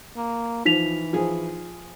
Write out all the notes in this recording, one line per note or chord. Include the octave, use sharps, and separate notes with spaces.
A#3
E3 F3 D#4 B6 F7
F3 G#4